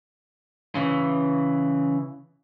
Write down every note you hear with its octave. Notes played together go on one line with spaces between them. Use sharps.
C#3 E3